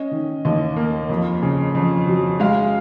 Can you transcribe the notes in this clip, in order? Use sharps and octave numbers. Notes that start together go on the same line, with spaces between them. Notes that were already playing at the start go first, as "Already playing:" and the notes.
Already playing: C#4 D#5
D#3
D#2 D#5
A#3
F2
C#3
F2
F#3
G#3 F5